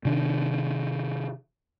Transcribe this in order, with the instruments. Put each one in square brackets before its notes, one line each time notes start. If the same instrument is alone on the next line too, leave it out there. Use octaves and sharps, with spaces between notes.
[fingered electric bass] C3 D#3 D4